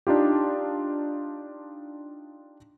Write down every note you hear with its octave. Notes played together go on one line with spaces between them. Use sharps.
D4 D#4 F4 G4